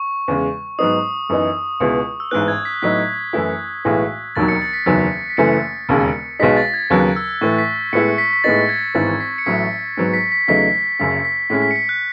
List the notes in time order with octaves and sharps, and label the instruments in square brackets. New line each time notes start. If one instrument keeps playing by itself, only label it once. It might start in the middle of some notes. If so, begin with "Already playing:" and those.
Already playing: [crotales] C#6
[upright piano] E2 C#3 G#3
[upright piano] G#2 F#3 B3 D#4 [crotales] D#6
[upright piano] F#2 E3 B3 D#4
C#2 B2 G#3 B3 E4
[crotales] E6
[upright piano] A1 G#2 E3 B3 [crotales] F#6
[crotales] G#6
B6
[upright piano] A2 F#3 B3 D#4 [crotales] B6
[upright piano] F#2 E3 A3 E4
B1 A2 E3 G#3
[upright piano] E1 D#2 D#3 F#3 [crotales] A6
[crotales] C#7
A6
B6
[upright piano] F#1 E2 D#3 F#3
[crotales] B6
[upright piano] F#1 F#2 E3 A3 [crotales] C#7
[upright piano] E1 D#2 C#3 G#3
[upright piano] B1 B2 G#3 D#4 [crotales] B6
[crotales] A6
G#6
[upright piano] D#2 C#3 F#3 B3 [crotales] F#6
[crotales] E6
[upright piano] A2 E3 A3 [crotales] C#6
[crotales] B6
[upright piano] A2 G#3 B3 E4 [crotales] C#7
[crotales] B6
B6
[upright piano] A2 G#3 B3 D#4 [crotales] A6
[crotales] G#6
[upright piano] G#1 G#2 E3 B3 E4 [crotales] A6
[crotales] B6
C#7
[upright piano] A1 A2 F#3 A3 [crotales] B6
[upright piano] G#2 F#3 B3
[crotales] B6
B6
[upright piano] E2 C#3 F#3 A3 D#4 [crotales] B6
[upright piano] F#1 F#2 C#3 [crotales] B6
[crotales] B6
[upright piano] A2 G#3 C#4 [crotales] B6
[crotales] B6
C#7
B6
F#6